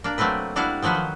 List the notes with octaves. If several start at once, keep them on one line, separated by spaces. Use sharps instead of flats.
A#3 D4
F#3 A3 A#3 C4 B4
G3 D4 E4 F#4 F5
D#3 F3 F#3 F#4 B4
D#3